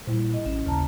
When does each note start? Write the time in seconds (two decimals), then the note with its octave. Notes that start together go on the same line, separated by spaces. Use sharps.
0.07 A#2 G3 E4 C5
0.34 D#5
0.46 A1 C#4
0.66 D#2 C#3 A5 A#5